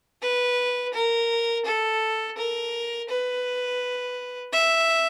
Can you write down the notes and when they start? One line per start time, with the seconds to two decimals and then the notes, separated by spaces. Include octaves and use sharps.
0.22 B4
0.93 A#4
1.65 A4
2.37 A#4
3.09 B4
4.53 E5